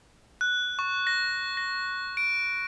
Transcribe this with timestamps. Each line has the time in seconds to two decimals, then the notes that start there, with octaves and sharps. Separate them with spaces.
0.41 F#6
0.79 C#6
1.07 A#6
1.57 A#6
2.17 D7